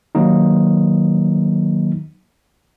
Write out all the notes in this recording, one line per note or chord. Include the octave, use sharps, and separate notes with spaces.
D#3 F#3 A#3 D#4